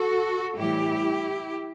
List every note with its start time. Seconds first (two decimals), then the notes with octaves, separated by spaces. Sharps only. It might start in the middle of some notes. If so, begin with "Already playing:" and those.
Already playing: F#4 A4
0.56 A2 E3 G3 E4 G4